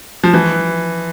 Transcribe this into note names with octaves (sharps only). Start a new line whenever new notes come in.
F3
E3